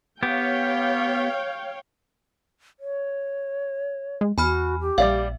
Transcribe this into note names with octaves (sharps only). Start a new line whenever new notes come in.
B3 G4 C#5 F5 G5
C#5
G#3
E2 F#4 G#5 B5 F6
G4
A#1 G3 D5 E5 F5